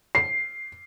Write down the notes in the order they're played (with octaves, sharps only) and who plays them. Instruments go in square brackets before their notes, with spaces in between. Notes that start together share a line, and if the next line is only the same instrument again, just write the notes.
[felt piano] C7